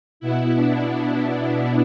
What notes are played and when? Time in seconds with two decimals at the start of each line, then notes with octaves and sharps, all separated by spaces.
0.20 B2 B3 E4
0.56 D4
0.89 E4
1.24 D4